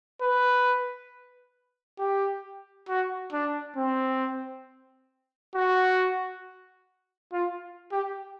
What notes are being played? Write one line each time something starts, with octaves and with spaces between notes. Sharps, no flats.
B4
G4
F#4
D4
C4
F#4
F4
G4